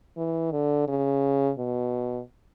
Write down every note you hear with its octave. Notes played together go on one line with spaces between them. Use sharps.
E3
D3
C#3
B2